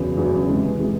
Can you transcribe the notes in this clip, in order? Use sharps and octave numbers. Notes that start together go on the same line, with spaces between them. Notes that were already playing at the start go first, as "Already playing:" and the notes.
Already playing: E2 C#3 F#3
E2 C#3 F#3
C3 E3 G#3
C3 E3 G#3